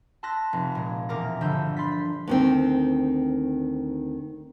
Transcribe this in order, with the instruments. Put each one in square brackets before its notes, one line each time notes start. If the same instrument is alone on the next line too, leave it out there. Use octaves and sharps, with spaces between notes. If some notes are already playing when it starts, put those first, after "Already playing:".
[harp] A5 C6 E6 F#6 A#6 B6
F1
A#2 G#3
E1 A#3 A#4 D6 A#6
G1 D3 F3 E6 G6
B5 C6 A6 B6
[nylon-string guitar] D2 D#3 C4